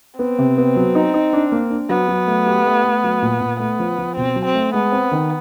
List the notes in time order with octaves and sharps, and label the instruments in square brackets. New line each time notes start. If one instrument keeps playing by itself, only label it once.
[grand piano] B3 [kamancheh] C4
[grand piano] C3
B3
F#3
D#4
D#4
D4
A#3
D4
[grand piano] F#3 [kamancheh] B3
[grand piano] F#3
A3
G4
A3
A3
F#3
A#2
A#2
[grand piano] A3 [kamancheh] B3
[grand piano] F3
F3
[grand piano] B2 [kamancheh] C4
[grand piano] F#3
[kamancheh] C4
[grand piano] A3
[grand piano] G#3 [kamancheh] B3
[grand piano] C4
D#3